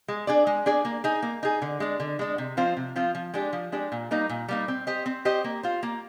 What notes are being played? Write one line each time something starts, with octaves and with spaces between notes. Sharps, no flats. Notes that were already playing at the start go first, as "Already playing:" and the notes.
G#3
D4 G#4 D5
G#3
D4 G#4 D5
A#3
D#4 G#4
A#3
D#4 G#4
D3
G#3 D4
D3
G#3 D4
C3
F3 C4 F4 C5
C3
F3 C4 F4 C5
F3
G#3 D4 G4
F3
G#3 D4 G4
A#2
G3 A#3 D#4
A#2
G3 A#3 D#4
C4
G4 C5 D#5
C4
G4 C5 D#5
A#3
F4 C5
A#3